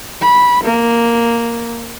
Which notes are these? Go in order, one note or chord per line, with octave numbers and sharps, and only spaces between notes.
B5
A#3